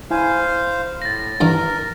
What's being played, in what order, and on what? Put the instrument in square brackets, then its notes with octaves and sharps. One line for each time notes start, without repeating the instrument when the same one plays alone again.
[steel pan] E4 G#5 [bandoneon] C5 F5
[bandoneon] A2 [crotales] A6 A#6
[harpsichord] G2 E3 A#5 [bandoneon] A#4